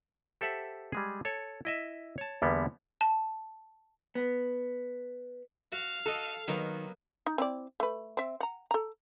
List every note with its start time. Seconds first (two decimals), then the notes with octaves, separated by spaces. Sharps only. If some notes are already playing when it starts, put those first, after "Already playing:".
0.41 G4 A4 C5 E5 F#5
0.92 G3 G#3 G#4
1.25 A4 C#5
1.65 E4 D#5 E5
2.18 C#5 A5
2.42 E2 D3 G3 A#3 B3
3.01 A5
4.15 B3
5.72 F#4 F5
6.06 F#4 A4 D#5
6.48 D#3 F#3 A#3 B3
7.26 D#4
7.38 C4 E4 D5
7.80 A3 B4
8.17 C4 E5
8.40 F#5 A#5
8.71 A4 A#5